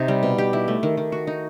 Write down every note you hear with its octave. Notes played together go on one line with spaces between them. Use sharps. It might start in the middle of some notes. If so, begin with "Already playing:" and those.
Already playing: C3 D#4
G3
B2
G4
E4
A3
D#3
D#3
F#4
D#4